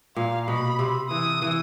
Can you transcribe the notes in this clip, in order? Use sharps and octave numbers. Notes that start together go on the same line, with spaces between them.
A#2 F5
B2 B5
C3
E3 D#6
E3